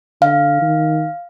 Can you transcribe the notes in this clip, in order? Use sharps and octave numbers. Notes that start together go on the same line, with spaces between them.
D3 F5
D#3